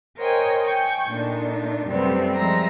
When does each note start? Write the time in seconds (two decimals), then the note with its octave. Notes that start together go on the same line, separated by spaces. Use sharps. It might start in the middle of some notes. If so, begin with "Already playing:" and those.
0.17 A#4 C5 C#5 D#5 G5 G#5
0.64 G5 G#5 C#6 G6
1.07 A#2 A3 D4 D#4
1.86 F#2 C3 G3 A3 B3 C4
2.34 F3 G3 G#3 E5 A#5 A#6